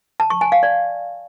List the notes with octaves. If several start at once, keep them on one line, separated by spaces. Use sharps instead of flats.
A5
C#6
G#5
F5
D5